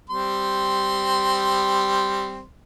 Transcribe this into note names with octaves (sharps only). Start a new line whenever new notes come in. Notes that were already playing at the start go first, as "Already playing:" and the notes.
G3 C4 C6